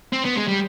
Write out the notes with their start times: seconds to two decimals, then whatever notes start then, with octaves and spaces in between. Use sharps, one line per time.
0.13 C4
0.25 B3
0.36 G#3
0.48 G3